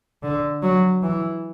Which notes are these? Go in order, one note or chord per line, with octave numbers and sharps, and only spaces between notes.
D3
F#3
E3